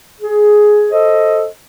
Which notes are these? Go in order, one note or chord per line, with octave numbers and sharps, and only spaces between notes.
G#4
A4 C5 D#5